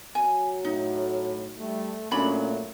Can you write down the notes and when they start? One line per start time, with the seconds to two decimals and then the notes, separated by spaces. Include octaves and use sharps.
0.15 F#3 G#5
0.65 A2 D#4
1.59 G3 A3
2.11 A#2 F#3 A3 C#4 D4 B5